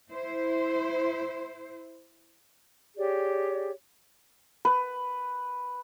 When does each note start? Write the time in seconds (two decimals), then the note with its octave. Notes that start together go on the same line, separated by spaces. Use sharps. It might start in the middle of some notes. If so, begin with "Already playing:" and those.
0.11 E4 C5
2.97 G4 G#4 C#5 D5
4.65 B4